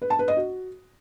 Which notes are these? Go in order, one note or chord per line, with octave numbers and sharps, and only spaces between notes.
B4
A5
B4
D#5
F#4